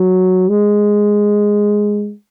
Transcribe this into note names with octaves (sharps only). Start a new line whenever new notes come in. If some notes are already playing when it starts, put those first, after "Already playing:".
Already playing: F#3
G#3